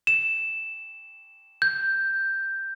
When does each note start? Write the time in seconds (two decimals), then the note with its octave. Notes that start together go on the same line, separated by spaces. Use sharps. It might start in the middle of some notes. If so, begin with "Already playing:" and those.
0.07 E7
1.62 G6